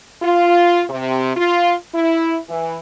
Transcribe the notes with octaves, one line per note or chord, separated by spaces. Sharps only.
F4
C3
F4
E4
E3